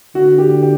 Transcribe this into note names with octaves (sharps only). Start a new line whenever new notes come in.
D3 F#4
G4
G4